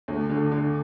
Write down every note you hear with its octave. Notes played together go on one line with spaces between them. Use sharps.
D2
D3
D3